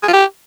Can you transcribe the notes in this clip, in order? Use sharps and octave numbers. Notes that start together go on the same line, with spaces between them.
G#4
F4
G4